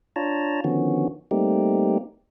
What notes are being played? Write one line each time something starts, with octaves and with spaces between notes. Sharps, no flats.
D4 F4 C#5 A5 A#5
D3 D#3 F3 B3 C#4 F#4
G3 A3 A#3 C4 D#4 G4